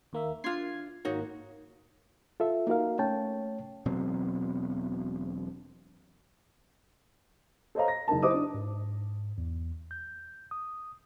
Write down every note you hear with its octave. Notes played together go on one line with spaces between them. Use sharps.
D#2 A#3 E5
D4 F4 C6 G#6 C7
G#1 A#3 D#4 F#4 C#5
F4 A4 E5
A#3 D#4 F#4 A#4 F5
A3 C#4 C#5 G5 A5
E1 B2 F#3 C4
A4 C5 C#5 D#5 F5 A#5
A#6
F#1 D#4 A#4 A5
E4 B4 C5 D#5 D6 D#6
D4
G#2
E2
G6
D#6